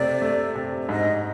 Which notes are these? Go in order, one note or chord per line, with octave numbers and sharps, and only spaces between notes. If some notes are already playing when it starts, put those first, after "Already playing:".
Already playing: C3 A3 D5
A3
C3
D5
G#2 D#5